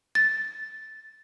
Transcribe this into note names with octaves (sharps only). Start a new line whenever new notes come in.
A6